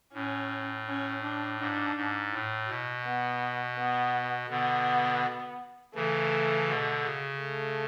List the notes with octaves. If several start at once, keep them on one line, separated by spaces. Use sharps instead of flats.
A2 C#4
C#4
D4
G#2 D4
G#2
A2
B2
B3
B3
B2 D3 B3
C#3 E3 A3
B2 D3
C#3
A3